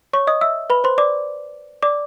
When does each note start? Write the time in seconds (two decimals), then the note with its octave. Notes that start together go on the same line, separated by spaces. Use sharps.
0.13 C#5 C#6
0.27 D#5 D#6
0.41 E5 E6
0.70 B4 B5
0.84 C5 C6
0.98 D5 D6
1.83 D5 D6